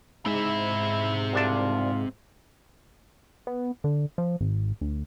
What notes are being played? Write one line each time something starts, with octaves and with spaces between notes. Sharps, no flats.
G#2 C4 E4 E5
C2 D4 F4 A5
B3
D3
F3
G#1
D2